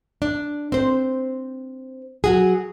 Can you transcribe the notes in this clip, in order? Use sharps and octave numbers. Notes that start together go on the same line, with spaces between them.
D4
C4 C5
F#3 F#4 G#4